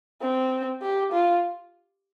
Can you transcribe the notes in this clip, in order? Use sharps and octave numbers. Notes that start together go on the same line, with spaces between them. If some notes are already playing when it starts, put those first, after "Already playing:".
C4
G4
F4